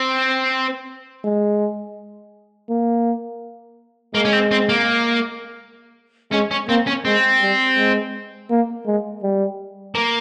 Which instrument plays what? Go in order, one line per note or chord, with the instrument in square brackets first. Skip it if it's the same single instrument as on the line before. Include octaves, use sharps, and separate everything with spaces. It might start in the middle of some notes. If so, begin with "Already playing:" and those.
Already playing: [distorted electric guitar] C4
[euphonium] G#3
A#3
[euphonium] G#3 [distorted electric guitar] A#3
[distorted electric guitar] C#4
C4
C4
A#3
[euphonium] G#3 [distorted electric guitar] C#4
[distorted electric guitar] C#4
[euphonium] A#3 [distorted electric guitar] C4
[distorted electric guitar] C#4
[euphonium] G#3 [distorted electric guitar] C4
[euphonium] G3
G#3
A#3
G#3
G3
[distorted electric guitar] A#3